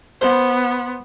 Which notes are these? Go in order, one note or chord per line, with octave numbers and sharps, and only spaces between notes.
B3 C5